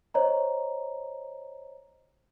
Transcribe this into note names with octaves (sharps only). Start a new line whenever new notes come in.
C5 C#5 D#5 A#5